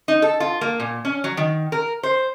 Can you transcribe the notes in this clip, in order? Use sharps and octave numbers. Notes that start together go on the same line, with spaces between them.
D#4
A4
F4
A#3
A#2
C#4
F#3
D#3
A#4
C5